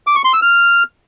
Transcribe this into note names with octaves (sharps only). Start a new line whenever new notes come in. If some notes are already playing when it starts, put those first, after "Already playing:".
D6
C#6
C6
E6
F6